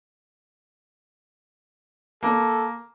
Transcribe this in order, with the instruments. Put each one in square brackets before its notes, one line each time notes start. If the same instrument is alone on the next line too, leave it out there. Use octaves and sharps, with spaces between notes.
[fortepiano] A#3 [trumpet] A4